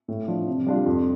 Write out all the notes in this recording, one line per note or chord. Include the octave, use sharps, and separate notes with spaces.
A2
F3 D4
C3
G3 D4 F4
F2